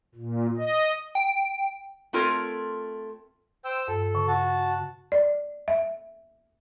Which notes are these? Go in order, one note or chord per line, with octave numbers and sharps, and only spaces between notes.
A#2
D#5
G5
A3 C4 F4 A#4 C#5
C5 G5 E6
G2 A4
C#3
F#4 A5
D5
E5